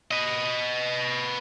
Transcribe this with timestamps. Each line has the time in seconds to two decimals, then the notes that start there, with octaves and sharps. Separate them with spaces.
0.11 B4 D#5